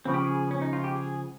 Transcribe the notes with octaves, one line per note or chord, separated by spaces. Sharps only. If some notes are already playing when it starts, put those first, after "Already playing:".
C#2 C#3 F3 C4
G4
G#4
C#4
D#4
F4
G4
G#4